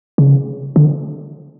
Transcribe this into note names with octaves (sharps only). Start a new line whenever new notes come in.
C#3
D3